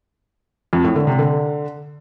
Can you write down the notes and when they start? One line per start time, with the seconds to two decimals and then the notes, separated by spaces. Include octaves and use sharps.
0.73 F2
0.84 A2
0.96 D3
1.07 C3
1.19 D3